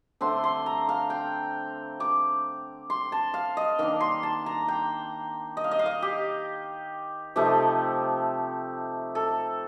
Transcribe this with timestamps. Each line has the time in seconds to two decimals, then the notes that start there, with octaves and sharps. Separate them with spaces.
0.21 D3 A3 C4 C6
0.44 C6
0.66 A#5
0.89 F5
1.10 G5
2.00 D6
2.90 C6
3.12 A5
3.34 F5
3.57 D#5
3.79 D#3 A#3 D4 F5
4.01 C6
4.23 A5
4.46 A#5
4.68 G5
5.57 D#5
5.64 F5
5.71 D#5
5.79 F5
5.86 D#5
6.02 G4
7.36 C3 F3 A3 D#4 G4
9.15 A4